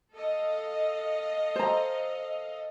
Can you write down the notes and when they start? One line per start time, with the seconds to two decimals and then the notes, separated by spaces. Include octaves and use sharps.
0.13 A4 D#5 F5
1.56 C5 A#5